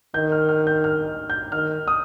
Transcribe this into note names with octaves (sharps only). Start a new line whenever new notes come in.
D#3 G6
F6
F6
G6
F6
G6
D#3 F6
D#6